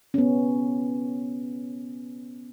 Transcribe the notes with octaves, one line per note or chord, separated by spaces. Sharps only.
B3 C#4